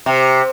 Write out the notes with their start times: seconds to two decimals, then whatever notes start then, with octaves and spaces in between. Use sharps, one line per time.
0.06 C3